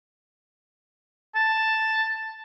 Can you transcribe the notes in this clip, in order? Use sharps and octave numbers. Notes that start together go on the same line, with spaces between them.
A5